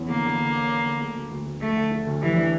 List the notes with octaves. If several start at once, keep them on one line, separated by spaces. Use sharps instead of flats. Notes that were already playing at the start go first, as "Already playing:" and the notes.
Already playing: E2 E3 C#4
D3 A#3
D3
D3
C#4
C#4
D3
A3
D2
D2
D2
D2 A3
D3
A3
D2
E3 G3
D4